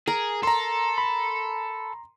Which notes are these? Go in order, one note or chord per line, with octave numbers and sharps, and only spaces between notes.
G#4 A#4
A4 A#5 C6
B5